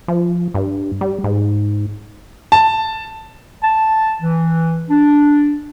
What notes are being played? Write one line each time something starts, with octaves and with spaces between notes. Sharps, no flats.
F3
G2
G3
G#2
A5
A5
E3
D4